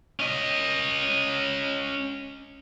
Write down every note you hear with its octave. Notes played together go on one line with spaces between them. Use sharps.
C#4 D#5